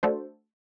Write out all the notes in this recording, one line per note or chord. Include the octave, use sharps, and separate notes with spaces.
A3 D4 F#4 A4 C5